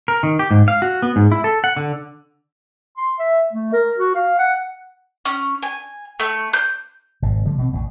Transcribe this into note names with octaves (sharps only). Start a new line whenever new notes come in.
A#4
D#3
G4
G#2
F5
F#4
B3
G#2
E4
A4
F#5
D3
C6
E5
A3
A#4
F#4
F5
F#5
C#4
G#5
A3
G6
G#1 B2
D3 F3 G3 A3
B2 A3 C4
A1 E2